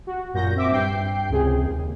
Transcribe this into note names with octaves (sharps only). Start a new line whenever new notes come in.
F#4
F#2 A#2 F#4 G6 A#6
C4 E5 D6
G2 G5 G6 C7
C#2 C3 G#4
D#2